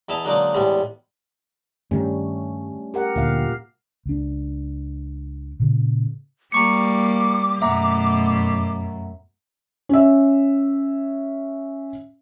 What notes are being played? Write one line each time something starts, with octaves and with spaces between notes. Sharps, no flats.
E2 E4 D#5 A5 A#5
D3 F#3 G#3 A#3 D#4 D5
E2 A2 G3 G#3
G2 D#3 G3 A3 C#4
G4 A#4 F#5
D2 A#2 F5
C#2 D4
A#2 C#3
G3 A#3 A#5 C#6 D6 C#7
F#2 B2 A3 E5 F#5 A#5
C#4 E5